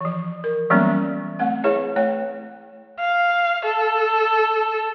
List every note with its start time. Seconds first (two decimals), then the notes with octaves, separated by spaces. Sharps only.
0.01 E3 F3
0.44 A#4
0.70 E3 F#3 G3 A#3 B3 C#4
1.39 A3 C4 F#5
1.64 E4 G#4 B4 C#5 E5
1.96 A3 C#5 G5
3.00 F5
3.65 A4